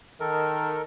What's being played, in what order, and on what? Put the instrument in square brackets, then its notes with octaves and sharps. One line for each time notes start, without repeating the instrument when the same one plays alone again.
[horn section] D#3 [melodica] A4 A#4